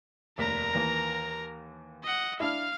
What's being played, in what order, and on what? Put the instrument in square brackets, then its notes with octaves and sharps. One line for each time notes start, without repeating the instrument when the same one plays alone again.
[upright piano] F1 D#2 B6 [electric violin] A#4 A#5
[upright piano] D#2 E3 A#6
[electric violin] D#5 F#5
[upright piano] D4 E4 [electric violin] F5 F6